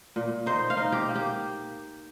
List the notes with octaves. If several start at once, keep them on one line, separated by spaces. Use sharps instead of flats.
A#2
D#4 C5
F5
D#4
G4
A#3
G4